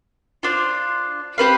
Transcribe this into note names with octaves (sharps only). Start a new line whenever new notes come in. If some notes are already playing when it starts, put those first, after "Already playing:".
D4 F4 C5
C4 G4 B4 F5